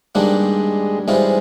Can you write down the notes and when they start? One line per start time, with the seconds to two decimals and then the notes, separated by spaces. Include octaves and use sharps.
0.15 G2 D#3 G3 G#3 A#3 D4
1.07 G#2 E3 G3 G#3 C4 F4